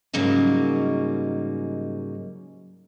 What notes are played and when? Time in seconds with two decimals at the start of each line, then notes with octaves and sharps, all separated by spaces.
0.13 G#2 C#3 F#3 G3 A#3 D#4